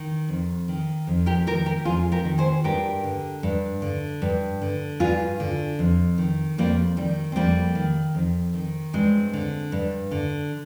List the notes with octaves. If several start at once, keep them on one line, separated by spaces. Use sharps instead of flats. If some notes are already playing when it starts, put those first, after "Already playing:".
Already playing: D#3
F2
D#3
F2
G4 A#4
D#3 G4 A#4
G4 A#4
F2 F4 G#4
G4 A#4
D#3
G#4 C5
G2 G4 A#4
D3
G2
D3
G2
D3
G2 F4 G#4
D3
F2
D#3
F2 G3 A#3
D#3 G3
C4
F2 G3 A#3
D#3
F2
D#3
G2 G#3 C4
D3
G2
D3